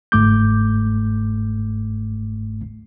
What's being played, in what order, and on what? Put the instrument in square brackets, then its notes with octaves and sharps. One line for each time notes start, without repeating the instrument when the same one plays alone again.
[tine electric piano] G1 G#2 A3 D6 G6